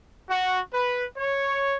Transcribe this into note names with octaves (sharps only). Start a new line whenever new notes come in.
F#4
B4
C#5